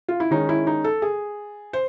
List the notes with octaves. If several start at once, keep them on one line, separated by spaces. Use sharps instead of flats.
F4
E4
D#3 G#3 C#4 D#4
E4
D#4
A4
G#4
C5